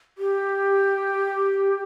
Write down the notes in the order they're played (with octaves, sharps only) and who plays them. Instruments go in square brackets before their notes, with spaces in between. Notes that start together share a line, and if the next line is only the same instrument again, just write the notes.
[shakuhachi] G4